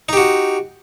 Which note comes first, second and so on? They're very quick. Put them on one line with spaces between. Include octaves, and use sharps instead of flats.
D#4 G4 F#4